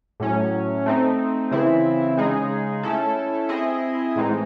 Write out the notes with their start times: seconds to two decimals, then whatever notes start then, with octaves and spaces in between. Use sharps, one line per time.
0.20 A2 F#3 C#4
0.86 A3 C4 D#4
1.51 C#3 E3 C4 E4
2.17 C#3 G#3 D#4 G#4
2.83 A3 C#4 E4 A4
3.49 C4 E4 G#4 D#5
4.16 A2 E3 G#3 C4 D#4